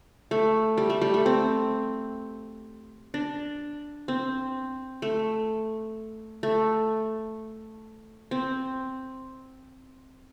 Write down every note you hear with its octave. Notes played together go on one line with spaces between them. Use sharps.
A3
G3
A3
G3
A3
C4
D4
C4
A3
A3
C4